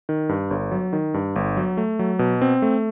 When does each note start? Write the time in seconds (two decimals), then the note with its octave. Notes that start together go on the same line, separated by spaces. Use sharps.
0.09 D#3
0.29 G2
0.51 G1
0.71 F#3
0.93 D#3
1.14 G2
1.36 G1
1.57 F#3
1.77 A3
1.99 F#3
2.19 B2
2.42 C4
2.62 A3